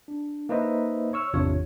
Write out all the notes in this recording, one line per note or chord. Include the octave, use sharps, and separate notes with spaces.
D4
A#3 D#4 B4 C5 D#5 E5
C#5 C#6 E6 F6
G#1 E2 C3 D4 F4 C#5